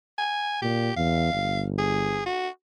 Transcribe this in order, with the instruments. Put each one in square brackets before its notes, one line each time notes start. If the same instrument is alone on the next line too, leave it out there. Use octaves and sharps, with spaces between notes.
[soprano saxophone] G#5
[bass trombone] A#2 [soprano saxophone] G4
[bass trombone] E2 [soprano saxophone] F5
[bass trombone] G1
[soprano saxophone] G#4
F#4